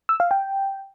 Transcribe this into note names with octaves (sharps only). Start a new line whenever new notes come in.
E6
F5
G5